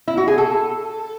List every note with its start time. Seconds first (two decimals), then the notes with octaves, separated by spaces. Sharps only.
0.08 E4
0.17 F#4
0.28 G#4
0.38 A4